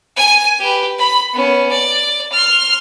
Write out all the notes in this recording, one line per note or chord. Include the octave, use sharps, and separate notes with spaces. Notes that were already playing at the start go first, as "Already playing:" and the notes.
G#5
G4 B4
B5
B3 C#4
D5
C6 F6